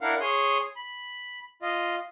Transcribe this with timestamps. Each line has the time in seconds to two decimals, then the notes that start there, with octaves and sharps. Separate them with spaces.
0.01 D4 E4 A#4 F5 F#5
0.21 G#4 C#5 C6 D#6
0.76 B5
1.62 F4 D#5